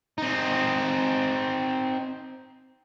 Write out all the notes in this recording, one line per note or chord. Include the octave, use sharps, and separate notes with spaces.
C4 D#4